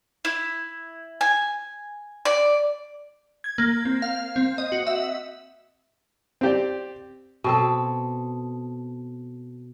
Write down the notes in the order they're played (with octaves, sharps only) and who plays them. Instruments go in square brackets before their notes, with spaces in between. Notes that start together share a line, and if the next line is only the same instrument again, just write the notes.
[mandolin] E4
G#5
D5
[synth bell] G#6
A#3
C4
F5
C4
D#5
F#4
E5
[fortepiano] C4 G4 D5
[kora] B2 C4 A4